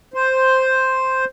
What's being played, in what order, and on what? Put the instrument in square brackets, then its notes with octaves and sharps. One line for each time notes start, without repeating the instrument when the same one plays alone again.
[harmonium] C5